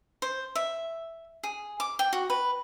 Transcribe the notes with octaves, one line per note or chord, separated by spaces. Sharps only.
C5
E5
G#4
D6
G5
F#4
B4